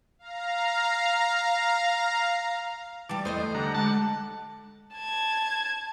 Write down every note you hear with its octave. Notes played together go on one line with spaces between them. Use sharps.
F5 A#5
E3 G3 A5 D6
E2 A3 A4 C5 D#5 D#6
D3 G3 F#5 A#5
G#3 A5
A5 G#6